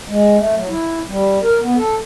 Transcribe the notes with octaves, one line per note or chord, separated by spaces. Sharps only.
G#3
A3
F#3
E4
G3
A#4
B3
A4